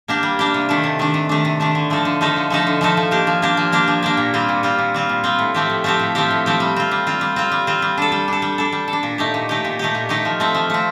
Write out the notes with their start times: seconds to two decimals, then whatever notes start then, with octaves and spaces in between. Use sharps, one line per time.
0.08 A#3 D4 G4
0.23 G3
0.39 A#3 D4 G4
0.54 C3
0.69 D#3 A3 D4
0.84 C3
0.99 D#3 A3 D4
1.14 C3
1.29 D#3 A3 D4
1.45 C3
1.60 D#3 A3 D4
1.75 D3
1.90 F3 A3 D#4 A4
2.05 D3
2.21 F3 A3 D#4 A4
2.36 D3
2.50 F3 A3 D#4 A4
2.67 D3
2.81 F3 A3 D#4 A4
2.97 F3
3.11 A#3 D4 G4
3.27 F3
3.42 A#3 D4 G4
3.57 F3
3.72 A#3 D4 G4
3.88 F3
4.02 A#3 D4 G4
4.17 A#2
4.34 G3 C4 F4
4.49 A#2
4.63 G3 C4 F4
4.79 A#2
4.94 G3 C4 F4
5.09 A#2
5.24 G3 C4 F4
5.39 A2
5.54 F3 A3 C4 G4
5.70 A2
5.84 F3 A3 C4 G4
5.99 A2
6.15 F3 A3 C4 G4
6.31 A2
6.46 F3 A3 C4 G4
6.60 G3
6.76 C4 F4
6.91 G3
7.07 C4 F4
7.21 G3
7.36 C4 F4
7.52 G3
7.67 C4 F4
7.82 G3
7.97 D4 A4
8.12 G3
8.28 D4 A4
8.42 G3
8.58 D4 A4
8.72 G3
8.88 A4
8.93 D4
9.03 A#2
9.18 A3 D#4 G4
9.34 A#2
9.49 A3 D#4 G4
9.65 A#2
9.79 A3 D#4 G4
9.95 A#2
10.09 A3 D#4 G4
10.25 F3
10.40 A3 C4
10.55 F3
10.70 A3 C4